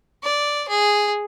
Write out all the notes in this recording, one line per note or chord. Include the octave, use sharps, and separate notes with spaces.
D5
G#4